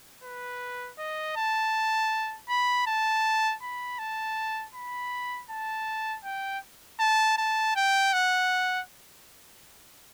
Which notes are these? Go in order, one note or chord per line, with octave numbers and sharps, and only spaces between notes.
B4
D#5
A5
B5
A5
B5
A5
B5
A5
G5
A5
A5
G5
F#5